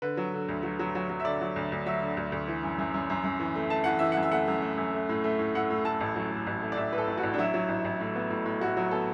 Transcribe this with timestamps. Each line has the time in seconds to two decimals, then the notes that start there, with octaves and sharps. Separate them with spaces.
0.02 D3 B4
0.17 F#3
0.34 D3
0.48 D2
0.63 F#3
0.79 F#3
0.95 F#3
1.10 F#3
1.20 E5
1.25 D3 D5
1.41 F#3
1.56 D2
1.72 D2
1.86 F#3 E5
2.02 D3
2.17 D2
2.32 D2
2.48 E3
2.63 F#2
2.79 F#2
2.94 F#2
3.10 F#2
3.24 F#2
3.40 E3
3.56 A3
3.70 A3 A5
3.84 E3 F#5
3.99 E3 E5
4.12 F#2 F#5
4.23 E5
4.32 A3 F#5
4.48 F#2
4.62 A3
4.78 F#2
4.94 A3
5.09 A2
5.24 A3
5.39 A2
5.55 A2 F#5
5.70 A2
5.85 A2 A5
6.00 A1
6.16 F#3
6.31 A2
6.47 A1
6.62 A3
6.72 D5
6.77 A1 E5
6.92 A2 B4
6.98 A4
7.07 A1
7.18 F#4
7.23 A1
7.34 D4
7.38 F#3 E4
7.54 F#3
7.69 A1
7.85 A1
8.00 A2
8.15 B3
8.30 A2
8.46 A2
8.61 A2 F#4
8.77 F#3
8.91 B3 A4